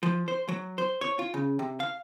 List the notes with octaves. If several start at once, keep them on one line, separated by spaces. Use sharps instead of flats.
F3
C5
F#3
C5
C#5
F4
C#3
C3
F5